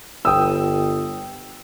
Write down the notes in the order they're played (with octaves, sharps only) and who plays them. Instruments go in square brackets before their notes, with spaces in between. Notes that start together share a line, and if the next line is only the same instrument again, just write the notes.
[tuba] G1 [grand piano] G5 D#6 E6